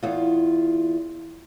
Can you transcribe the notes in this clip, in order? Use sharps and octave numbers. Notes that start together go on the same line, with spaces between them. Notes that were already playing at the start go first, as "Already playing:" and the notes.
E2 F4